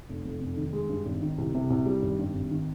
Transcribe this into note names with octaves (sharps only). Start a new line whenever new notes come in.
F1
F2
F1
D#3
G#3
G2
G#1
D#3
C2
C3
C2
G3
G#1
G2
G#1
D#3